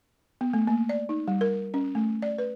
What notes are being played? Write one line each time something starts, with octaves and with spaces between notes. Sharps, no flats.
B3
A3
A#3
D5
D#4
G3
A#4
C#4
A3
D5
B4